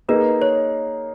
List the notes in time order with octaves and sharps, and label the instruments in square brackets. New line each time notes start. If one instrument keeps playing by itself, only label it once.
[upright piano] A#3 D#4 G#4 D#5 [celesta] B4
[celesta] C#5